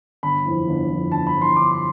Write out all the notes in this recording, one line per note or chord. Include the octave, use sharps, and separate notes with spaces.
G1 B5
F2 E3
G1
F2 E3
G1 A5
B5
F2 E3
C6
G1 D6
C6